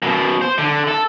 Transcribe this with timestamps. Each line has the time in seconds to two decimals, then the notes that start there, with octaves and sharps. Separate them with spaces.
0.02 F#2 B2
0.42 C5
0.58 D3
0.88 A4